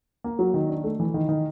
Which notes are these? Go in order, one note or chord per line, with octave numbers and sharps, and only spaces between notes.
A#3
F#3
D#3
D4
A3
E3
D#3
D#3